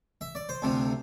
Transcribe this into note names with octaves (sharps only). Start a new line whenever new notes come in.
E5
D5
C5
D2 C3 F3